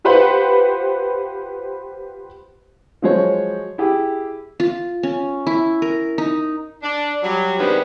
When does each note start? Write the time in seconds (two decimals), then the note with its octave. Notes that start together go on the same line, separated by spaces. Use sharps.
0.04 F4 G4 B4 C5 F#5 B5
3.02 F3 F#3 G#3 C5 C#5
3.78 E4 G4 G#4
4.60 F4
5.03 C#4
5.47 E4
5.82 A#4
6.18 D#4
6.83 D4
7.23 F#3 G3
7.59 C3 D#3 G3 G#3 B3 D4